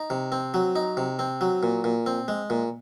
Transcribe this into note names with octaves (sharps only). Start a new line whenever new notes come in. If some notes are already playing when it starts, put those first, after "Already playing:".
Already playing: D#4
C3
C4
F#3
D#4
C3
C4
F#3
A#2
A#2
C4
G#3
A#2